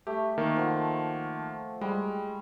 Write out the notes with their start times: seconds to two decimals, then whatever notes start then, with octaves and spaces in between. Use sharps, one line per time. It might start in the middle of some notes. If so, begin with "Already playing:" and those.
0.07 A3 G4
0.38 D#3 A#3
0.56 F3 F#5
1.81 G3 G#3